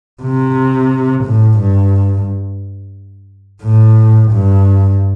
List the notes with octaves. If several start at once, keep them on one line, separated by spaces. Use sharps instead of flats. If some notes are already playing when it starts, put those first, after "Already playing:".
C3
A2
G2
A2
G2